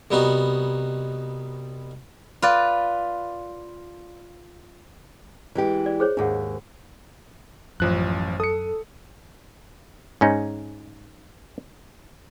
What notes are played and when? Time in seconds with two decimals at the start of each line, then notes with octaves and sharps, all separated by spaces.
0.11 C2 G3 B3 D#4 F#4
2.42 F4 B4 D5
5.55 E3 G#3 G4
5.86 D5
6.00 G#4 C5 C#5
6.17 D#2 G#2 D4 G#4 F#5
7.80 A1 F#2 F3 F#6
8.40 A4 D#6 C#7
10.21 G#2 C#4 D#4